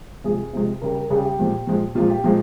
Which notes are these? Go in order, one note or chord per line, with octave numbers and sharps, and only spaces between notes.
C3 F3 G#3 G#4
C3 F3 G#3
C#3 G3 A#4
A#4
C#3 G3 G#4
G4
A#2 F3 G#3
A#2 F3 G#3
A#2 F3 G#3 F4
G4
A#2 F3 G#3 F4